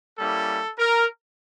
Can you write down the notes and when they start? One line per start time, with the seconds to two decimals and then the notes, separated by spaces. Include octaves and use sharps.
0.18 G3 A#3 C#4 E4 A4
0.79 A#4